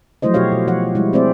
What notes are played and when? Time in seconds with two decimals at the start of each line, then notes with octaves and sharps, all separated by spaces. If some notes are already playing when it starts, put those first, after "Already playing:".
0.22 F3 F#3 A3 E4 C5 D#5
0.34 B2 F#4 G4 C#5 F5
0.52 B2
0.67 F3 C#5 F#5
0.95 G3 G#3 E4
1.13 A3 C4 G#4 C5 D5 E5